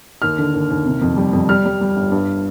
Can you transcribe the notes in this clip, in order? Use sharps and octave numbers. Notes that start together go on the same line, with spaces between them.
D#2 F6
D3
D#2
D#2
C3
F2
G3
F2
G3 F6
G3
G3
G1
G2